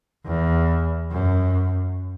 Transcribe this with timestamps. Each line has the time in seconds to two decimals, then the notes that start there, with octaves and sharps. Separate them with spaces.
0.26 E2
1.11 F#2